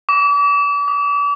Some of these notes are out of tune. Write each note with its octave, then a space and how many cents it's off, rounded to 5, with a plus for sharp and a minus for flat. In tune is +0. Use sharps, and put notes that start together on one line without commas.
D6 -40
D6 +45